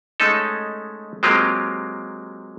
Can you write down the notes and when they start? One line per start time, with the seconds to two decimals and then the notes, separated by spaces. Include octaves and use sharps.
0.20 G#3 A3 C#4 D#4 A4
1.23 F#3 G#3 A#3 C4 F4 G4